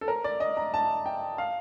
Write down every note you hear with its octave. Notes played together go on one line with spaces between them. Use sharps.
A4
A#4
D5
D#5
A#5
A5
G5
F5